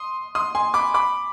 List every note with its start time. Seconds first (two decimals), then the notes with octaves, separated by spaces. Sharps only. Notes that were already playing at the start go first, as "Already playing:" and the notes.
Already playing: C6 D#6
0.35 C6 D#6
0.55 G#5 C6
0.74 B5 D6
0.94 B5 D6